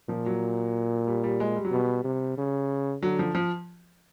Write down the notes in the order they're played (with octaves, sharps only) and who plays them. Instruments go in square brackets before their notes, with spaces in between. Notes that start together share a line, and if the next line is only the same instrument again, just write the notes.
[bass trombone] A#2 [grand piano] F3
[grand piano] F#3
G3
G3
G#3
G3
F#3
[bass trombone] B2 [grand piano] G3
[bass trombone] C3
C#3
[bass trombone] D3 [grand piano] F#3
[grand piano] F3
F3